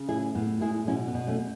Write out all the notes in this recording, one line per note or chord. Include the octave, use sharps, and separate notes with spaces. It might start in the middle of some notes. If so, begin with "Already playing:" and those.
Already playing: C#3
A2 E4 G#4
A2 B3
G#3 E4 G#4
B2 C#4 E4
B3
B2
A3 C#4